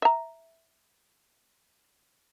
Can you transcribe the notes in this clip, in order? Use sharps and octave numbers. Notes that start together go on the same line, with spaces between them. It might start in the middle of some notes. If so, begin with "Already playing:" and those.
E5 A#5